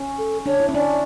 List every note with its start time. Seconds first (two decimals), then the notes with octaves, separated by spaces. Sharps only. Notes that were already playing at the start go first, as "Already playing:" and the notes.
Already playing: C#4
0.18 A4
0.46 D4 C#5
0.60 E4
0.69 C#4
0.74 D4 D5